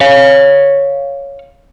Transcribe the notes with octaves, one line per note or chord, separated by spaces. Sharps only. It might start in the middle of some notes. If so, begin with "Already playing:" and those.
C#5 F5